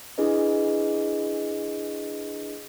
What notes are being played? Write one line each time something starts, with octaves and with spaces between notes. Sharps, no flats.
D4 E4 G#4 B4 D#5